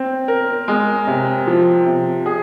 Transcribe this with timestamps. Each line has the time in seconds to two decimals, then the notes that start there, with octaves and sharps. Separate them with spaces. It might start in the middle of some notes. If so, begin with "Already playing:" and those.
Already playing: C4
0.28 A#4
0.68 G#3
1.07 C3
1.47 F3
1.86 C3
2.26 G#4